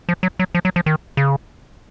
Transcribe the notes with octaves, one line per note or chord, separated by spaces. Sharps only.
F3
F#3
F#3
F3
F#3
F3
D#3
C#3